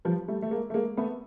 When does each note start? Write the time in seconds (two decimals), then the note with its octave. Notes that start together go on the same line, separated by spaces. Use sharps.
0.05 F3 G3
0.28 G3 A3
0.42 A3
0.51 G#3 A#3
0.70 A3
0.74 G#3 A#3
0.97 A3 B3